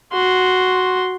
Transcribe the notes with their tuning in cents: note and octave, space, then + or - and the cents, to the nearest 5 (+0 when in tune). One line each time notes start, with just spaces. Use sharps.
F#4 +0 C6 +0